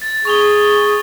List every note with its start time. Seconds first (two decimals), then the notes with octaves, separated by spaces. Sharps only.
0.02 A6
0.25 G#4 C#6 F7 G7